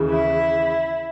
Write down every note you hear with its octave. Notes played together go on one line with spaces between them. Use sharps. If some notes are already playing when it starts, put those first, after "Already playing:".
Already playing: D#2 C#3 E3
E4